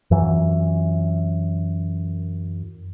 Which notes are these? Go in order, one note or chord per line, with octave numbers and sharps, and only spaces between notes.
F#2 E3